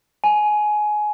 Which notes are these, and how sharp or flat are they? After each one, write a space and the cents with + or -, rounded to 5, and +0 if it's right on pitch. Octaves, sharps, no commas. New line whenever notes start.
G#5 +20